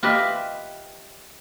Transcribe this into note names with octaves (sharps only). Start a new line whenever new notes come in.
F4 G4 B4 D#5 E5